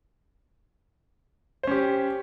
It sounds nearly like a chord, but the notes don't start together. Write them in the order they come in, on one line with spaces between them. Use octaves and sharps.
C5 C#4 G4